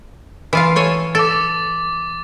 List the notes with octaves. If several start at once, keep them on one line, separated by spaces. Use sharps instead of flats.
E3 F4 F5
A4 C#5 G#5
A4 D6 A6